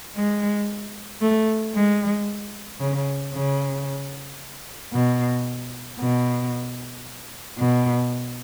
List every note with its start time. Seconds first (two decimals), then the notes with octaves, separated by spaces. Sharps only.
0.15 G#3
1.21 A3
1.75 G#3
2.80 C#3
3.33 C#3
4.93 B2
5.99 B2
7.58 B2